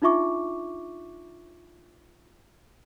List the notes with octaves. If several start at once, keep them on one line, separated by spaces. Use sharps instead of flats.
D4 D#4 F4 E5 C#6 D6